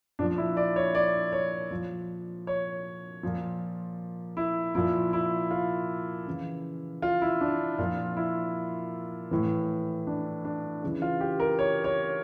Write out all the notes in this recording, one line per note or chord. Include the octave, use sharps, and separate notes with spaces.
A#2 F3 D4
E4
D5
C#5
D5
C#5
A#2 F3
C#5
A#2 F3
E4
A#2 F3 E4
E4
F4
C#3 E3
F4
E4
D4
A#2 F3 F4
E4
A2 E3
D4
D4
C#3 E3
F4
G4
A#4
C#5
C#5